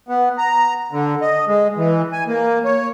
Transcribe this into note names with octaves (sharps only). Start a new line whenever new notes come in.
B3
A#5
D3
D#5
G#3
E3
G#5
A#3
C#5